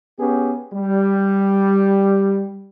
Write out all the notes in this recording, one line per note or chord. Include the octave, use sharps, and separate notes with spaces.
B3 C#4 G4 G#4
G3